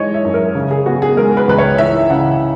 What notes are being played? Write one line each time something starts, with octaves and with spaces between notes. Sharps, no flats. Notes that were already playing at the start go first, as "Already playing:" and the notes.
Already playing: E3 G#3 D#4 C#5 D#5
E5
F#2
A#4
C#3
G#4
B3 F#4
G#4
G#3 A#4
B4
C#2 B4
C#5
E3 E5
C#3 F#5